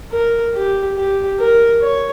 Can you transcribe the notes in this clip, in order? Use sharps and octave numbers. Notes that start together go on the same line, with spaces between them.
A#4
G4
G4
A#4
C#5